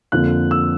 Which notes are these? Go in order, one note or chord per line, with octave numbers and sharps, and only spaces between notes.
F2 D3 F3 A#3 F#6
E6